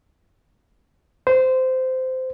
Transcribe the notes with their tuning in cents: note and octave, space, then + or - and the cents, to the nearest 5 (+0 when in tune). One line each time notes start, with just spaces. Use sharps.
C5 -15